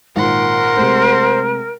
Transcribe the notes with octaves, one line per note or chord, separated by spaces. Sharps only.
G#1 A#2 A#4 F#5 C6
C3 G#3 A3 C5